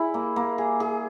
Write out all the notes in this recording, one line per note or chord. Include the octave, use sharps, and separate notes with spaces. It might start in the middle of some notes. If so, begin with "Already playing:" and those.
Already playing: E4 G#4
A#3
A#3
G#4
G#4